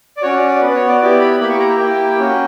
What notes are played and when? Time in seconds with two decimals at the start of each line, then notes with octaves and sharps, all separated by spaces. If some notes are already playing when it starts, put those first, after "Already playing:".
0.17 D5
0.22 C#4 F#4 C#5
0.36 D5
0.49 D5
0.61 B3 F#4 B4
0.75 C#5
0.88 D5
1.01 B3 E4 G4 D5
1.21 B5
1.40 A#3 E4 G4 B5
1.50 C#6
1.59 A#5
1.69 G5
1.79 A#3 E4 G4
2.18 A#3 C#4 F#4